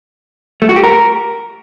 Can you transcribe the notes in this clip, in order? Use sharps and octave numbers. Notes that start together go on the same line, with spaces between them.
A3
F#4
G4
A#4